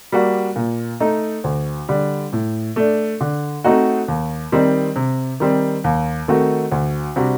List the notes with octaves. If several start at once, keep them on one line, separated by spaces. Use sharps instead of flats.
G3 A#3 F#4
A#2
A3 D#4
D2
D3 G3
A2
A3 D4
D3
A3 C4 D#4 F#4
D#2
D#3 G3 C4 D#4
C3
D#3 G3 C4
D#2
D#3 A3 C4 F#4
D2
C3 G3 D4 F#4